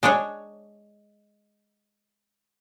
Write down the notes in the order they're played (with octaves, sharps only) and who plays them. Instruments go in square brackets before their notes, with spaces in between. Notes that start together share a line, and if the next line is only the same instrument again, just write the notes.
[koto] G#3 D4 G#4 C#5